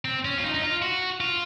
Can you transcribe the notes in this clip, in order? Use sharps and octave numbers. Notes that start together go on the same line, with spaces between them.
C4
C#4
F4
D#4
D#4
F4
F#4
F4